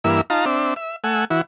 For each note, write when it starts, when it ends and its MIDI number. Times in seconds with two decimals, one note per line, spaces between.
0.04 0.21 43
0.04 0.21 52
0.04 0.21 58
0.04 0.21 64
0.04 0.21 88
0.30 0.45 63
0.30 0.45 65
0.30 0.45 77
0.30 0.45 81
0.30 0.45 82
0.46 0.74 60
0.46 0.74 62
0.46 0.74 76
0.76 0.96 76
1.04 1.25 57
1.04 1.25 78
1.04 1.25 80
1.04 1.25 88
1.30 1.41 52
1.30 1.41 64
1.30 1.41 66